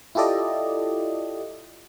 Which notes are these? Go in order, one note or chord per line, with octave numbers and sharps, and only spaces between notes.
E4 F4 G4 A4 D5 D#5